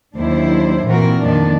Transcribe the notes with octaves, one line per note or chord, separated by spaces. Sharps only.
D#2 F#3 D4 E4 C5
A#2 E3 C4 F#4 A#4
F2 A#2 D#3 F3 D4